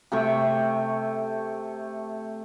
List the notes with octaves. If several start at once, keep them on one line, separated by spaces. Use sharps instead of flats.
C3 A3 G5 C#6